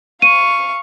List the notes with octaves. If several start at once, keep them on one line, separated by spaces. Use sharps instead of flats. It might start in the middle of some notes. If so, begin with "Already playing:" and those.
F5 C#6 D#7